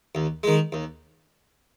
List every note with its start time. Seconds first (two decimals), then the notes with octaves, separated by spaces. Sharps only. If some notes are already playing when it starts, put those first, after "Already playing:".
0.15 D#2
0.43 D#3 G#3
0.72 D#2